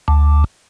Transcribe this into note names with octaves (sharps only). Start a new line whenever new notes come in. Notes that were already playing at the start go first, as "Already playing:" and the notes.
D2